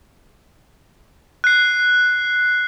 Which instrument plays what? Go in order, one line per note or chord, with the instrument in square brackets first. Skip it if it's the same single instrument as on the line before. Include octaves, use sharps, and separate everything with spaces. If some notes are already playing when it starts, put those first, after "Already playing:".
[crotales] F#6 C7